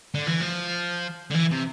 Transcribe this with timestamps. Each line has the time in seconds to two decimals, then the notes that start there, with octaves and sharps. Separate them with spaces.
0.14 D3
0.27 E3
0.40 F3
1.31 D3
1.35 E3
1.52 C3